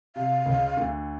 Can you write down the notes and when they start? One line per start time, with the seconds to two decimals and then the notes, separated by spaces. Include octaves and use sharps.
0.16 C3 F5
0.46 C#2 C#3
0.77 D2 D3